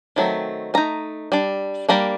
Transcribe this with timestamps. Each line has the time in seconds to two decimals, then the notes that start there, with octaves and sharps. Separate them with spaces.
0.16 D#3 F#3 A3 C4
0.74 A3 D#4 A#5
1.32 G3 D4
1.89 G3 A#3 D4 A#5